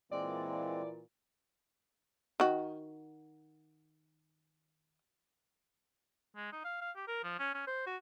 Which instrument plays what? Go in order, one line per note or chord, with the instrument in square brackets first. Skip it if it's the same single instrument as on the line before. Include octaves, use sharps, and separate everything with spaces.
[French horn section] A#2 E3 [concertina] G#3 C4 [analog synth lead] D5
[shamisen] D#3 F#4
[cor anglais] G#3
D#4
F5
F5
G4
A#4
F3
C#4
C#4
C5
F#4